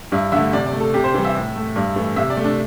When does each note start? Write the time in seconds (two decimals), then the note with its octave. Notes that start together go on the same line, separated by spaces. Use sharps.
0.12 G2 E4
0.32 D3 A3 E5
0.53 C3 D5
0.66 D5
0.73 A3
0.80 A4
0.94 C3 G4
1.04 C5
1.14 E3 G3
1.25 E5
1.35 A2
1.56 A3
1.76 G2
1.96 E3 A3
2.16 C3 E5
2.30 D5
2.37 A3
2.44 D4